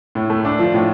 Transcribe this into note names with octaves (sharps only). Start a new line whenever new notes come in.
A2
A3
D4
F3
A2